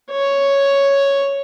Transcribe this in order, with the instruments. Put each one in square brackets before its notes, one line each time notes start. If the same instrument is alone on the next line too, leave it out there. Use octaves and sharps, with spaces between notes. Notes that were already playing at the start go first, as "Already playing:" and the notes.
[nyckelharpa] C#5